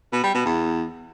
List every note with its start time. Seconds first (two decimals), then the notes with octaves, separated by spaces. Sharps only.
0.12 B2
0.23 G3
0.34 B2
0.45 E2